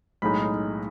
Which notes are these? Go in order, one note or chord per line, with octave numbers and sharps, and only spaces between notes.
B1 A2 G#3 D#4 B5